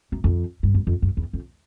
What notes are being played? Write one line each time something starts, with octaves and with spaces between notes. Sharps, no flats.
F#2
F2
G2
F#2
F2
F#2
E2
F2